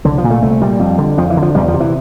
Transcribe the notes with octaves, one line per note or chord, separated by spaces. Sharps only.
C2 D3
F3
A#2
A3
C2 A3
A#2 G3
F2
D3
F2 F3
E3
D3
F3
E2 G3
F3
C3
E3